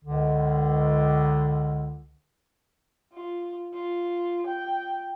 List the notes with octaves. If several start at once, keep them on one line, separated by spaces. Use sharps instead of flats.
C#2 D3
F4
F4
G5